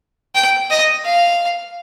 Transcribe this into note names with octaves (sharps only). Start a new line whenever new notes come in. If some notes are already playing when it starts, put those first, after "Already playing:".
G5
D#5
F5